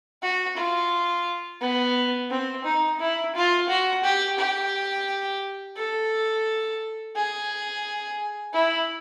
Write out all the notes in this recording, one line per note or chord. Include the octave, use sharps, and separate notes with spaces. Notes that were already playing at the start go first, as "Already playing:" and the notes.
F#4
F4
B3
C4
D#4
E4
F4
F#4
G4
G4
A4
G#4
E4